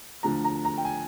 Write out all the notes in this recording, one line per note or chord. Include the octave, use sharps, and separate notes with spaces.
D2 D3 F3 A#5
A#5
A#5
G5
G#5